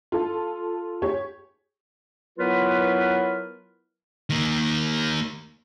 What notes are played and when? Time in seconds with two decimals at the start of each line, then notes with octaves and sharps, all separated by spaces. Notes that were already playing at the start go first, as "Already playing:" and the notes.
0.12 F4 A4
1.02 G4 G#4 C#5
2.38 F#3 B3 E4 F4 A#4 B4
4.30 D#3 A#3